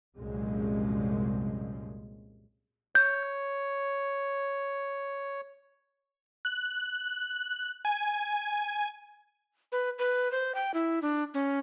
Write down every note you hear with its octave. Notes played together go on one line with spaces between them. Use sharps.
C2 F#2 A#2 F3 G#3
C#5 G6
F#6
G#5
B4
B4
C5
G5
E4
D4
C#4